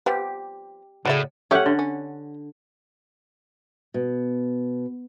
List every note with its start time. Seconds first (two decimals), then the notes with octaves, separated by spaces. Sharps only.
0.06 F3 B3 G4
1.05 A2 C#3 F#4 D5 E5
1.51 A3 C#4 G4 E5 F#5
1.66 D3
1.79 C#4
3.94 B2